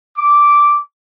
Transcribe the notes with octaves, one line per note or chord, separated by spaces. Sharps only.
D6